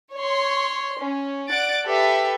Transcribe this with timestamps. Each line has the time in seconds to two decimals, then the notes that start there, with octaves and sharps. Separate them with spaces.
0.15 C#5 C6
1.01 C#4
1.49 D5 F#5 F#6 A6 D7
1.85 G4 A4 B4 E5